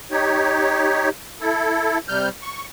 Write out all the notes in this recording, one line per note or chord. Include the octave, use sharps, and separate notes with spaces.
D#4 G4 C#5
E4 A4
C3 G3 F6 G6
C#6